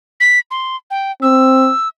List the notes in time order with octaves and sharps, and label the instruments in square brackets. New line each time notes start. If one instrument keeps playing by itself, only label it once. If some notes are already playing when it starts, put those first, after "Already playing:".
[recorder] B6
C6
G5
[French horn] C4 [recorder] E6